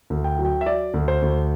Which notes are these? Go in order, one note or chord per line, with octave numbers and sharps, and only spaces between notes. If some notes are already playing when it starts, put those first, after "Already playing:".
D2
G5
F#3
G5
E5
F#3 D5
D2
C5
D2